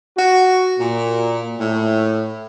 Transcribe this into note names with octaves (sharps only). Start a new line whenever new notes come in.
F#4
A#2
A2